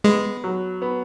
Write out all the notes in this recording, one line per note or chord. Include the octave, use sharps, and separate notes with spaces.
G#3 B3
F#3
B3